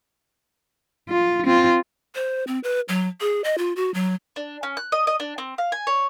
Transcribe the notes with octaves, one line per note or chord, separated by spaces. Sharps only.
F4
C4 F4
C5
C4
B4
F#3
G#4
D#5
F4
F#4
F#3
D4
C#4
F#6
D#5
D#5
D4
C4
F5
G#5
C#5